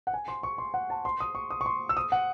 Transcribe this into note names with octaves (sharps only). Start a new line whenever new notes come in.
F#5
G#5
C6
C#6
C6
F#5
A5
C6
D#6
C#6
D#6
C#6
C6
E6
D#6
F#5